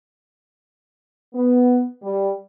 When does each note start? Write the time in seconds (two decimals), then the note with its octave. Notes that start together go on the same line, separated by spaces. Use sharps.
1.34 B3
2.02 G3